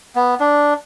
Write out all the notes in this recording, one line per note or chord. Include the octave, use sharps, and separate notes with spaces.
B3
D4